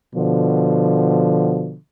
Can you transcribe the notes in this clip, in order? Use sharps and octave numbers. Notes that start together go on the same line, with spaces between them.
B2 D3 F3